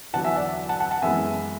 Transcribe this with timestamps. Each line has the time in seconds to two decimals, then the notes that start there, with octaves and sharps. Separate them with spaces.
0.13 E2 D3 F#3 F#5 A5
0.24 E5 G#5
0.36 D5 F#5
0.69 F#5 A5
0.80 F#5 A5
0.91 F#5 A5
1.02 F#2 E3 G#3 B3 E5 G#5